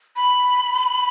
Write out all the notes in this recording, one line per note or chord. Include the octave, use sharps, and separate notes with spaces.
B5